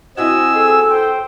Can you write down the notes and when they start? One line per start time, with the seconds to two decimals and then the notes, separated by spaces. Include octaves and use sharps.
0.17 C4 E4 F#4 D#5 G#5 E6
0.55 G#4 A4
0.90 C5 G5